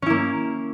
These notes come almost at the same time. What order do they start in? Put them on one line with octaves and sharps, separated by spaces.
C#4 E4 A#3